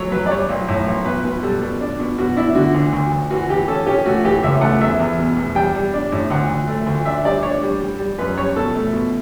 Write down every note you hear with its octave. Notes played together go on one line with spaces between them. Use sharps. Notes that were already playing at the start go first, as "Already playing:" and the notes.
Already playing: F#3 A3 C#5
F#3 B4
D5
G3 C#5
B1
A2
B1
B2 B4
B2 B4
G3 A4
B2
D4
B2
B2 F#4
D4 E4
D3 F#4
D2
D2
D2
E3 F#4
E3 G4
C#4 A4
C#4 G4
A3 F#4
E3 G4
C#2 E5
A3 F#5
E2 E5
E2
B2
E2
G3 G5
G3
D4
A2
D2 F#5
D2
A3
D2
D4 E5
G3 D5
D4 C#5
G3
G3
G3
F#2 B4
G3 C#5
B2 A4
A3
B2